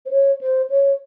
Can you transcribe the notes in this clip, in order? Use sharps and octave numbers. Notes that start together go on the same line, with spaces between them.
C5
C#5
C5
C#5